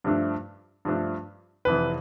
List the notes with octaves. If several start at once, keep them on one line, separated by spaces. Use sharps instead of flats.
G2 F3 A3 D4
G2 F3 A3 D4
F1 F2 E3 B4